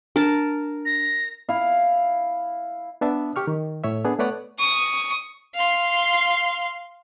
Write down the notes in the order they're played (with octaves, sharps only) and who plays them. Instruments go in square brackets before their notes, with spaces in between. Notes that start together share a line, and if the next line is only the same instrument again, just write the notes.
[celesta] D4 [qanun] A#4 A5
[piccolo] A#6
[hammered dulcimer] E4 F5
[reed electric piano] B3 D4 E5 A5
G4 C#6 F6
D#3
A2 C#5 E5
B3 D4 G#4
A3 B3 B4 C#5 D5 F#5
[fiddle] C#6 D#6
[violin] F5 C6